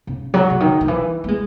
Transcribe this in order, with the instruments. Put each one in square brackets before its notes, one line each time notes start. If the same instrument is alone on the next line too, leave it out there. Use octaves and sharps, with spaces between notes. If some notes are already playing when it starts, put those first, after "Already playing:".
[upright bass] C#3
F#3
C#3
D#3
D#3
E3
A#3
G#3